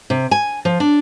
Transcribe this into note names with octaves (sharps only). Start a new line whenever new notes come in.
C3
G#5
F3
D4